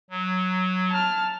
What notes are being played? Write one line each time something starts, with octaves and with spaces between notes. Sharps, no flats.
F#3
A5 F6